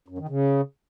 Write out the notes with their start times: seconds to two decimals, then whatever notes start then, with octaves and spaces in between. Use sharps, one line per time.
0.08 F#2
0.19 D#3
0.29 C#3